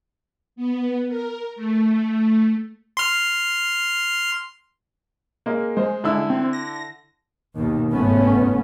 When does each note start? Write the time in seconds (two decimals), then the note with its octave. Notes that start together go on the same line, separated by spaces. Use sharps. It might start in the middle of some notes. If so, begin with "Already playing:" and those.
0.56 B3
1.08 A#4
1.56 A3
2.97 C6 F6
5.46 G#3 A#3
5.77 G#3 C5
6.04 D3 E4 E6
6.30 C4
6.53 A#6
7.56 D#2 B2 D#3
7.91 F#1 G#2 A3 B3 C#4